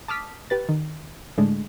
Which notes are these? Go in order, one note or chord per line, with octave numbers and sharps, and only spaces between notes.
A5 D6 D#6 F6 B6
G4 B4 A6
D#3
A2 D3 G#3 A3 D4